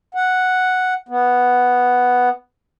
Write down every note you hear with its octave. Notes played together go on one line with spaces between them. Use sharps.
F#5
B3